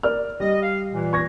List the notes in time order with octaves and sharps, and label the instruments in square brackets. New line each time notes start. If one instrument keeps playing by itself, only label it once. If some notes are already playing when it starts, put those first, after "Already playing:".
[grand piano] A#4 D5 F6
[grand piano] G3 [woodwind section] D#5
[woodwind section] F5
A#2 E3
[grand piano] C#6 G#6 A#6